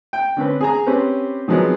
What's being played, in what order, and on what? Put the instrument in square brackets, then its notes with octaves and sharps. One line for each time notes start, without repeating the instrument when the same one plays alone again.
[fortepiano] G5
D3 C4 C#4 B4
G#4 G#5 A#5
C4 C#4 G4 B4 C5
D#3 F3 F#3 G#3 B3 C4